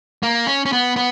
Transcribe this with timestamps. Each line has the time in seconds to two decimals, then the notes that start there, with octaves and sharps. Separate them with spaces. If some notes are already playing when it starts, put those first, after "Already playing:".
0.23 A#3
0.47 C#4
0.66 C#4
0.73 B3
0.96 B3